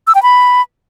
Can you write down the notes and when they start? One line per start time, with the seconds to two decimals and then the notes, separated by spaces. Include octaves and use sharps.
0.07 E6
0.15 G5
0.23 B5